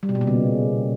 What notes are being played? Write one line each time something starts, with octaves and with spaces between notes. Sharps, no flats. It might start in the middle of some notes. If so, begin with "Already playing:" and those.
G3
B2
A#2
B2
C#3